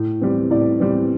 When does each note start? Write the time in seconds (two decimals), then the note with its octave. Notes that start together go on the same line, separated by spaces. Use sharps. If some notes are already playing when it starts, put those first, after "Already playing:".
Already playing: A2
0.21 E3 G3 C4
0.51 A2 D5
0.80 E3 G3 C4